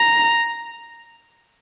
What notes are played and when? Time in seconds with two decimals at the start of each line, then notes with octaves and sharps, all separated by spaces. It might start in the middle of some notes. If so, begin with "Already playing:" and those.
Already playing: A#5